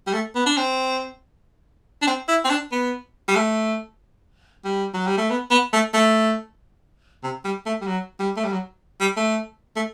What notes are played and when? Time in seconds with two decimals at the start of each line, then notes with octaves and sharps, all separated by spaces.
0.07 G3
0.13 A3
0.35 B3
0.46 D4
0.57 C4
2.02 D4
2.07 C4
2.28 E4
2.45 C4
2.50 D4
2.72 B3
3.28 G3
3.35 A3
4.65 G3
4.94 F#3
5.07 G3
5.18 A3
5.30 B3
5.51 B3
5.73 A3
5.94 A3
7.23 C3
7.45 G3
7.66 A3
7.81 G3
7.87 F#3
8.20 G3
8.37 A3
8.45 G3
8.52 F#3
9.01 G3
9.16 A3
9.76 A3